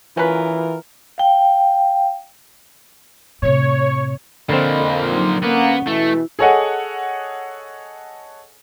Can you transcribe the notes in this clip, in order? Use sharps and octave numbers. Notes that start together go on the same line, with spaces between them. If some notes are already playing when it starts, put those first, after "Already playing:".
E3 C#4 F4 A#4 B4
F5 G5
A2 C3 C#5
A#2 D3 F3 C4 D#5 B5
F2 A#3
F#3 D#4 C6
A#3 B3 C#4 F#5
B2 E3 A3 E4
G#4 A4 C#5 D#5 F#5 G#5